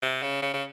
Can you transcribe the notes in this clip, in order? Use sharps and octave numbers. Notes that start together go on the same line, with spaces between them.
C3
C#3
C#3
C#3